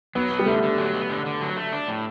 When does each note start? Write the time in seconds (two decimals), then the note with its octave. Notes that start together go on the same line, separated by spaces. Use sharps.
0.15 F#3 B3
0.31 B3
0.39 G3
0.46 D3 A3
0.63 D3
0.78 F#3
0.94 B3
1.10 D3
1.26 D3
1.41 F#3
1.57 A3
1.73 D4
1.88 A2